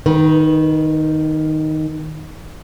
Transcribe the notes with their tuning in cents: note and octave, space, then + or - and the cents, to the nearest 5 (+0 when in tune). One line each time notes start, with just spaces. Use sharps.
D#3 +0 B4 -25